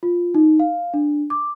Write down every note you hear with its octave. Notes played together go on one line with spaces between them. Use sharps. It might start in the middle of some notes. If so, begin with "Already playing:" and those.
F4
D#4
F5
D4
D6